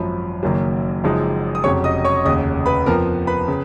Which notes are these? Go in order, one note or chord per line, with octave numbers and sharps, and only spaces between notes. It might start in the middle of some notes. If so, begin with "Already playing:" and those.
Already playing: G#1 F#2 F3 B5
F#1 F#2 D#3 F#3 A#3
F#1 F#2 F3 G#3 D#4
D#6
F1 F2 C#3 F#3 C#5 C#6
D#5 D#6
C#5 C#6
F1 D#2 C#3 D#5 D#6
B4 B5
F2 F3 B3 A#4 A#5
B4 B5
C#3